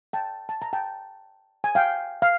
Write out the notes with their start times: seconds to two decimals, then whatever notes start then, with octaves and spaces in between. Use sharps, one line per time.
0.13 G5 A5
0.49 A5
0.62 A#5
0.73 G5 A5
1.64 G#5
1.75 F5 G5
2.22 F5